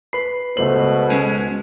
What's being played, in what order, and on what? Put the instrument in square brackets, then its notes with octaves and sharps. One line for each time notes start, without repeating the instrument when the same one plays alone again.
[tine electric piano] B4 C7 [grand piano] B5 F#7
[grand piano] C#2 A3 F#7 [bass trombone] B2 [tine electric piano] C5
[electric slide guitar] G#3 C#4